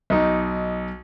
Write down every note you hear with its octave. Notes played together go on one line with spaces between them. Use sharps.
B1 D#4